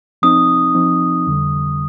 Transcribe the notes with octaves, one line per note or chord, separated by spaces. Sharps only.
F3 C4 D#4 D#6
F3 C4 D#4
F2 D3 G3